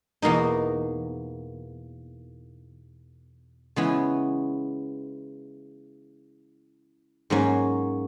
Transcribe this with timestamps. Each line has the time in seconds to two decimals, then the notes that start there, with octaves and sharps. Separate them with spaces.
0.22 E2 B2 A#3 D#4 A#4
3.76 C#3 E3 G#3 B3 E4
7.30 G#2 F#3 A#3 C#4